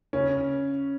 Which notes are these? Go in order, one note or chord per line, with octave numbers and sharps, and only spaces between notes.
C#3 C#4